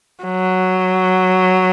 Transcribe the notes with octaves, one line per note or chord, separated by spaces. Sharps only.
F#3